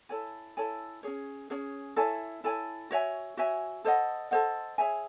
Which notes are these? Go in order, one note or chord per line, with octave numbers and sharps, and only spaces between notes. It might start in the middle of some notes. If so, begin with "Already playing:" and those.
E4 A4 C#5 G#5
E4 A4 C#5 G#5
C#4 G#4 C#5
C#4 G#4 C#5
E4 A4 C#5 G#5
E4 A4 C#5 G#5
F#4 C#5 E5 G#5
F#4 C#5 E5 G#5
A4 C5 D#5 F#5
A4 C5 D#5 F#5
G#4 C#5 E5 G#5